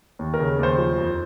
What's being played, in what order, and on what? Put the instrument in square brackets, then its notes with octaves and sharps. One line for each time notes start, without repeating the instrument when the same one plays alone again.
[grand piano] D#2
A#4
C#3
D#2 C5
F3
F2